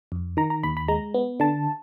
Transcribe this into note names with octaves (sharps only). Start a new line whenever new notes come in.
F2
D#3 A#5
A#5
D#2 B5
B5
G#3 A#5
B3
D3 A5